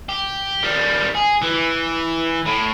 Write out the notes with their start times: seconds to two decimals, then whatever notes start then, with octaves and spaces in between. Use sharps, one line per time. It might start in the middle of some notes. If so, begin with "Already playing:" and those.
0.09 G4
0.63 D#3 G3
1.15 G#4
1.42 E3
2.46 A2